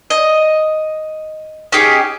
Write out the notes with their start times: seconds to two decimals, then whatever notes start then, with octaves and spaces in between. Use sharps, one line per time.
0.10 D#5
1.72 C#4 D#4 G4 G#4